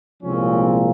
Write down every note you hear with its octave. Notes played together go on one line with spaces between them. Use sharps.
C2 A#2 F3 G#3 C4 C#4